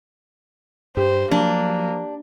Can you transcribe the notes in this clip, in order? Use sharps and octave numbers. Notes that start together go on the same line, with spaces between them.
G2 G4 C5
F3 F#3 A#3 D4